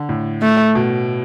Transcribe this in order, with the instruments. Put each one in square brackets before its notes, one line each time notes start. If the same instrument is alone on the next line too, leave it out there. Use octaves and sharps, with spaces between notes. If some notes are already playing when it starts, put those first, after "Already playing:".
Already playing: [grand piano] D3
A2
[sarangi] A3
[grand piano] B2